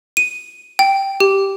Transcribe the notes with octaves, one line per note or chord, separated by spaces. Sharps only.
D#7
G5
G4